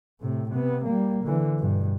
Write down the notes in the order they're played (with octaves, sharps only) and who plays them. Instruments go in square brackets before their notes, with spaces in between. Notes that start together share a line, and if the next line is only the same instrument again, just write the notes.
[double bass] A2 C3
C3 B3
G3 A#3
D3 E3
G2 B2